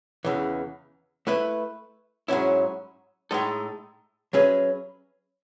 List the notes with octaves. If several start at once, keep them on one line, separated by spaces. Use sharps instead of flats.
E2 C#3 E3
A3 E4 B4 E5
G#2 F#3 C#4 E4
A2 G#3 D#4 A4
F#3 C#4 G#4 B4 E5